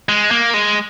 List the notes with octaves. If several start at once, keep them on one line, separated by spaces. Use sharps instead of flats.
G#3
A#3
G#3